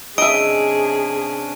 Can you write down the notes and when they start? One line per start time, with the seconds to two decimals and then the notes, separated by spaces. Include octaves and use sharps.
0.18 C3 C#4 D4 G#4 D#5 E5 D7 D#7